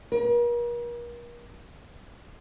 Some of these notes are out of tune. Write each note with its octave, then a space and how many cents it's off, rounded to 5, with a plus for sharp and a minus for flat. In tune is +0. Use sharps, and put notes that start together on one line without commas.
A#4 +40